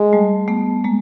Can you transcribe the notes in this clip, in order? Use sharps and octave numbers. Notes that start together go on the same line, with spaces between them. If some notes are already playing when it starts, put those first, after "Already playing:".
Already playing: G#3
G3 A3
A3 B3
G#3 A#3